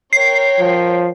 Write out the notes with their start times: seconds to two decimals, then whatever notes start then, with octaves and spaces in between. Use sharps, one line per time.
0.13 A#4 C#5 G5 C7
0.60 F3